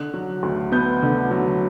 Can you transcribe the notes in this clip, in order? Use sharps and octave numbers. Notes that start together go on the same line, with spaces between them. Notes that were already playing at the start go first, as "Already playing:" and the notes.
Already playing: D3 F#6
F#3
D2
B3 G6
D3
F#3